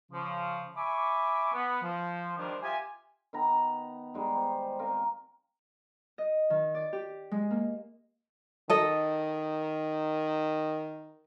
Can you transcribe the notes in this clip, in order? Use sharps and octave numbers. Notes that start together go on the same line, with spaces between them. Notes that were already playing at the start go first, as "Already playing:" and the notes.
C#3 F3
E5 G#5 B5 C#6 D6
B3
F3
D#3 F3 G3 D4 A#4 C5
F4 G4 E5 G#5
D#3 B3 A#5
G3 G#3 D#4
C5
C4 A#4 F5 G#5
D#5
D#3
D5
G4
G#3
A#3
D#3 A4 D#5